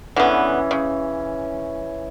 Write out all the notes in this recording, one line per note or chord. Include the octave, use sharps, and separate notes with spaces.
D3 E3 B3 C#4
C#3